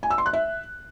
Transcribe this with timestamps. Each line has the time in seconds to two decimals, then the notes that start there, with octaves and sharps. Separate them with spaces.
0.03 G#5
0.11 E6
0.18 C6
0.26 F#6
0.33 E5